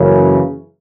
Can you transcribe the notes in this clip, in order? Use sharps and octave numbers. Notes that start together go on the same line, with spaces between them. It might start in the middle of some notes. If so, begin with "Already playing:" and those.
Already playing: F#2 C#3 E3 A#3 C#4